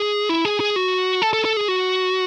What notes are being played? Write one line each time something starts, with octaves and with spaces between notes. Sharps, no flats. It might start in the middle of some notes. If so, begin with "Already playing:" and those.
Already playing: G#4
E4
G#4
G#4
F#4
A4
A4
A4
G#4
F#4